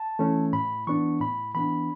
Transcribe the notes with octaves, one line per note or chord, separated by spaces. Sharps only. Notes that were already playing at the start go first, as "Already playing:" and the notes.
Already playing: A5
E3 A3 C#4
A2 B5
E3 B3 D4 C#6
A2 B5
E3 B3 D4 B5